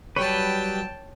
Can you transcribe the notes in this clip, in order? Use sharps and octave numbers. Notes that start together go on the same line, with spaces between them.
F#3 G3 B4 C#5 G5 A5